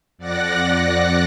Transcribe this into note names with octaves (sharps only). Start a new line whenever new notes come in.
F2 D5 F#5 F#6 A#6